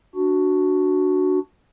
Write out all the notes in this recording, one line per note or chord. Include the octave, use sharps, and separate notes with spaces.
D4 F#4